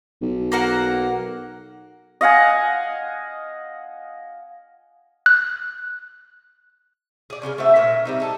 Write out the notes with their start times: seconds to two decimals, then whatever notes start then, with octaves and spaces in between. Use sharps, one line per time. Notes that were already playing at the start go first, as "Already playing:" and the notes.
0.22 B1
0.52 A#3 A#4 F#5
2.21 D#5 F5 F#5 G#5
5.26 F#6
7.30 G#4 D5
7.42 C#3 F3 C#4 G#5
7.58 A3 C4 F#4 E5
7.76 A#2 C#4 A#4 E5
8.05 G3 C4 D#4
8.20 G#4 A4 A5